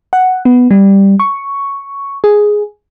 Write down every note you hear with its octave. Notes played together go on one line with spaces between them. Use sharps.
F#5
B3
G3
C#6
G#4